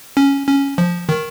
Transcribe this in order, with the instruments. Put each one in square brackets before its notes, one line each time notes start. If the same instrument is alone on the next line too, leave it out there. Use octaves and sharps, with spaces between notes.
[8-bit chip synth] C#4
C#4
F3
D#3